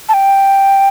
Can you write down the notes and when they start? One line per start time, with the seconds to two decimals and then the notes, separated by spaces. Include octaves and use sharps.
0.09 A5
0.14 G5